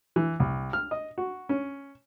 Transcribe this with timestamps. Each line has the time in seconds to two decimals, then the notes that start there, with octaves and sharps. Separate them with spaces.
0.16 E3
0.40 C2
0.73 F6
0.91 D#5
1.18 F#4
1.49 C#4